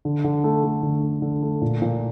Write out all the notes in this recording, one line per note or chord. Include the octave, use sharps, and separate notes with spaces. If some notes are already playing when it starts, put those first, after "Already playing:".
D3
D3
A3
A3
D3
A3
D3
A3
A#2
A#2